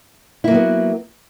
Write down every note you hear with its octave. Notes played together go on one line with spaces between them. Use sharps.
F#3 A#3 B3 E4